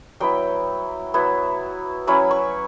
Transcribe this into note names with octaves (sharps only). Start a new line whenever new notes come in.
F#3 B3 E4 G5
F#3 B3 E4
F#3 C#4 E4 B5
C#6